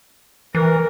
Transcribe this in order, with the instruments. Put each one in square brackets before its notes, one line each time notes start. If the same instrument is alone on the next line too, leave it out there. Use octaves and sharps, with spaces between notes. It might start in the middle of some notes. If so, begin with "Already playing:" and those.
[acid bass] E3 [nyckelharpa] A#4